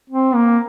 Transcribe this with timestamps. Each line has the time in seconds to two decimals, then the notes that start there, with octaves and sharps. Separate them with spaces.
0.10 C4
0.35 A#3